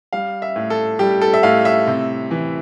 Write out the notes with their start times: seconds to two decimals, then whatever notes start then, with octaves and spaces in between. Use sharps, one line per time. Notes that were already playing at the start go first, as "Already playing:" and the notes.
0.13 G3 F5
0.42 E5
0.56 A2
0.70 A4
0.99 G3 G4
1.22 A4
1.34 E5
1.43 A2 F5
1.65 E5
1.87 C3
2.31 E3